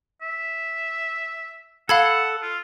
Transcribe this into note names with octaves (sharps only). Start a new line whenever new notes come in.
E5
A4 F5 F#5 B5 G#6
F4